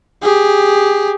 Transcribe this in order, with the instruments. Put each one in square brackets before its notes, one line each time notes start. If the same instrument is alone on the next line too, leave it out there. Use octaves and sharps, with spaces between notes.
[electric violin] G4 G#4